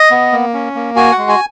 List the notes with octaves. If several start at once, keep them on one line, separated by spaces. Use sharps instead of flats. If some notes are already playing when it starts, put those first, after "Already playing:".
Already playing: D#5
B3
A#3
C#4
A#3
F#4 G#5
F#5
G#3
G#5